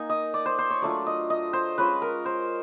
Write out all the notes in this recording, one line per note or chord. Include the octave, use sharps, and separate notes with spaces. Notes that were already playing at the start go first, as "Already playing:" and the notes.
Already playing: A#3 D#4 G#5
D#5
D5
C5
C5
C#5
F#3 A3 D4 F4 D5
D#5
D#5
C5
G#3 C#4 F4 B4
A#4
C5